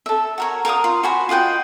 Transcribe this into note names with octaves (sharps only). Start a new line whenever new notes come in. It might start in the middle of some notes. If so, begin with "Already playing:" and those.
A4 E5
F#4 A#4 C#5
A#4 F5 F#5 D#6
F4
F#4 C5 G#5 B5
F4 D#5 F#5 G5